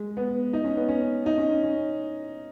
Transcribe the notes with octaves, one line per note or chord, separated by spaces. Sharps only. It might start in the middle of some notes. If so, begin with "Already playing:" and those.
Already playing: G#3
B3
D#4
C#4
B3
C#4
D#4
C#4
C#4
C#4